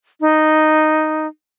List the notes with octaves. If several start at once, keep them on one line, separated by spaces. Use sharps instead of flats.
D#4